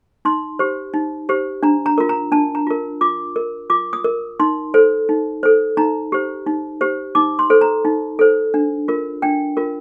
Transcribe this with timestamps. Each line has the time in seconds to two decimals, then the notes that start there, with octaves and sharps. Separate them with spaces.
0.25 D#4 C6
0.59 G4 C5
0.94 D#4
1.29 G4 C5
1.63 D4 A#5
1.86 A#5
1.98 F4 A#4
2.09 A#5
2.32 D4 A5
2.55 A#5
2.67 F4 A#4
3.01 F4 D6
3.36 A#4
3.70 F4 D6
3.93 D#6
4.04 A#4
4.40 D#4 C6
4.74 A4 C5
5.09 D#4
5.43 A4 C5
5.77 D#4 A#5
6.12 G4 C5
6.47 D#4
6.81 G4 C5
7.15 D#4 D6
7.39 C6
7.50 A4 C5
7.61 A#5
7.85 D#4
8.19 A4 C5
8.54 D4
8.88 F4 A#4
9.22 D4 G5
9.57 F4 A#4